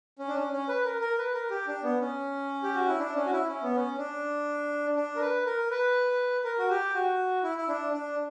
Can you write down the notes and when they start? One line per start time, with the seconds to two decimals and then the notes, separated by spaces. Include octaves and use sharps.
0.19 C#4
0.28 D4
0.36 C#4
0.52 C#4
0.68 B4
0.85 A#4
1.01 A#4
1.18 B4
1.34 A#4
1.50 G4
1.67 D4
1.83 B3
2.01 C#4
2.63 G4
2.75 F#4
2.88 E4
2.99 D4
3.16 C#4
3.26 F#4
3.32 E4
3.49 C#4
3.62 B3
3.75 C#4
3.97 D4
4.96 D4
5.16 A#4
5.21 B4
5.46 A#4
5.70 B4
6.44 A#4
6.58 F#4
6.70 G4
6.94 F#4
7.43 E4
7.58 E4
7.68 D4
7.93 D4